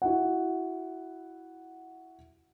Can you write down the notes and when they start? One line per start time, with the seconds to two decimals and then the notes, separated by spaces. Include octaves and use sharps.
0.02 E4 F#4 F#5